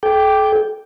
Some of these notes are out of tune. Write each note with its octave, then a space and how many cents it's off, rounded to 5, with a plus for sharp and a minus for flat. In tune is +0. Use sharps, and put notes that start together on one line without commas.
A4 -45 G5 +0 D6 +0